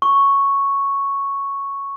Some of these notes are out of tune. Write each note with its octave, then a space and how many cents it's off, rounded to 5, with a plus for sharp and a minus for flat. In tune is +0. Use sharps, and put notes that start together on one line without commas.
C#6 +0